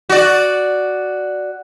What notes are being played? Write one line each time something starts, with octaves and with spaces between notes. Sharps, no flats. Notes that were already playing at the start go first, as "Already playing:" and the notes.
F#4 D5